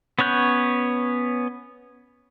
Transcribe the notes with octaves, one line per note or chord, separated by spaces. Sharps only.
B3 C#4 C#5 F#6 G6